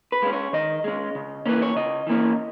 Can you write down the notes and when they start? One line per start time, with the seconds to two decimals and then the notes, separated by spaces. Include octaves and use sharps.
0.12 B4
0.23 G#3 C#4
0.33 C#5
0.53 D#3 D#5
0.84 G#3 C#4
1.15 C#3
1.46 E3 A#3 C#4 B4
1.62 C#5
1.76 C#3 D#5
2.07 E3 A#3 C#4